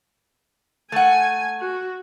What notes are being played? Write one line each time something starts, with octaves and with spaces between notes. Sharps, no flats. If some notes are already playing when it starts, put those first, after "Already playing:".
A3 F#5 G#5
F#4